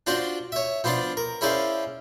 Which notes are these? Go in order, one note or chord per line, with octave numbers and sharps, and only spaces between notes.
D4 F4 F#4 C5 D5
C#5 E5
F3 B3 D4 F4 D5
A#4
C#4 E4 G#4 C5 D5 F5